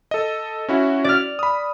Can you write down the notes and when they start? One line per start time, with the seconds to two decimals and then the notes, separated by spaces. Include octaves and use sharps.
0.11 A4 D#5
0.68 C#4 E4 F#4
1.04 D5 F6
1.39 B5 D#6